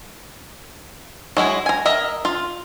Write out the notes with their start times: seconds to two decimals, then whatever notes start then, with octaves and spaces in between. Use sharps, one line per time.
1.37 F#3 G#3 E4
1.66 G#5 A#5
1.86 A#4 D#5 E5
2.25 F4